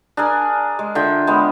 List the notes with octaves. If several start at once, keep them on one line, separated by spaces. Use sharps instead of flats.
D4 G#4 A#4 G#5
G#3
D3 F4 E5 G5
G#3 B3